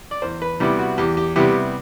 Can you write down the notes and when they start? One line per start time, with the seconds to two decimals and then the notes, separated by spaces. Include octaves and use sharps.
0.11 D5
0.22 E2 C5
0.42 B4
0.60 C3 G3 B3 E4 G4
0.79 F#4
0.98 E2 G4
1.17 G4
1.36 C3 G3 B3 E4 G4